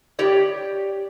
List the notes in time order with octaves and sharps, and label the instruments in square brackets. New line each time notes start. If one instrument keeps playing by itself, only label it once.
[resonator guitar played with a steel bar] G4 C#5 D5